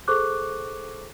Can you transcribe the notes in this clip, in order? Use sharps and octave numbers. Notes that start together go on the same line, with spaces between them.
G#4 A4 C5 C#6 D6 F#6